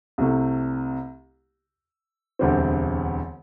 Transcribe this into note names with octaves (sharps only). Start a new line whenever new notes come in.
C2 C3 A3
E1 D2 D3 G3 C4